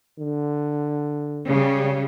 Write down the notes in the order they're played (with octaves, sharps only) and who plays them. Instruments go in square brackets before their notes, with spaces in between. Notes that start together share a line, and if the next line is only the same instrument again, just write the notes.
[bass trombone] D3
[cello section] C#3 G3